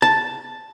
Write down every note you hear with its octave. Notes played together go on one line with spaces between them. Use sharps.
A5